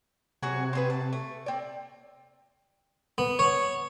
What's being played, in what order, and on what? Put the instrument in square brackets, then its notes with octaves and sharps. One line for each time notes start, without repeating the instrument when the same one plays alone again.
[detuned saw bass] C3 [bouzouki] F#3 F#4 G#4
[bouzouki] C4 G#4 B4
A5
A3
C4 D5
[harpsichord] B3
C#5